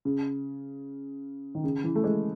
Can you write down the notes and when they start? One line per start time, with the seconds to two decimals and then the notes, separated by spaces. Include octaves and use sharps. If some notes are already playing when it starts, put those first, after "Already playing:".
0.05 C#3
1.55 D#3
1.64 C#3
1.84 E3
1.95 A3
2.04 G#3